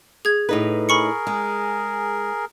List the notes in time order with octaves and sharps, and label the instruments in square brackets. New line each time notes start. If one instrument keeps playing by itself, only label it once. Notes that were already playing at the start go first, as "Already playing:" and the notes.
[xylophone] G#4 G#6
[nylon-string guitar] A2 D#4 B4
[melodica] G#4 A#4 [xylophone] B5 C#6 C#7
[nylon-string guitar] G#3